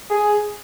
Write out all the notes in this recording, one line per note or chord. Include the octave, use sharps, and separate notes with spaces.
G#4